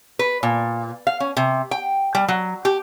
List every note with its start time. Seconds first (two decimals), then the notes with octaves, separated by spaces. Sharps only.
0.19 B4
0.43 A#2
1.07 F5
1.20 C#4
1.37 C3
1.71 G5
2.15 G3
2.28 F#3
2.65 G4